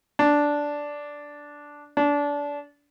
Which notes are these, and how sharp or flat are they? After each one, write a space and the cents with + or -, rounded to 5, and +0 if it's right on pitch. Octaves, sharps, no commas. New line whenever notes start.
D4 -5
D4 -25